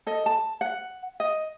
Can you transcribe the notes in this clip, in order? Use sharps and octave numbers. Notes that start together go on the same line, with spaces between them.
A4 D#5
A5
F#5
D#5